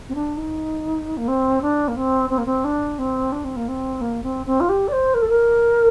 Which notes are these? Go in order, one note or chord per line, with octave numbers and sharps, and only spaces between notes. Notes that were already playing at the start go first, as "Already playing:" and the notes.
C4
D4
D#4
A#3
C4
D4
A#3
C4
C4
A#3
C4
D4
C4
D4
C4
A#3
C4
A#3
C4
C4
F4
G4
D5
C5
A#4
A4
A#4